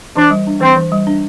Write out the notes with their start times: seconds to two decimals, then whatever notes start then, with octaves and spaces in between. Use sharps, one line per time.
0.16 E3 D4
0.31 G3
0.47 D4
0.61 E3 C4
0.77 E3
0.92 G3
1.07 D4